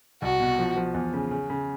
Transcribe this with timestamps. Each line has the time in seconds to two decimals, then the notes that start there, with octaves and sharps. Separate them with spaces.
0.22 C2 F#4
0.40 B2
0.59 F3
0.77 F3
0.94 E2
1.14 C#3
1.31 C#3
1.50 C#3